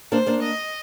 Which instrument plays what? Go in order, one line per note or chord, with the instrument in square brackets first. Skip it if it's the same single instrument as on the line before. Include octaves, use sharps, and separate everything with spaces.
[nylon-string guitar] A#3 D4 [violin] C5
[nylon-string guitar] A#3 D4
[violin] D#5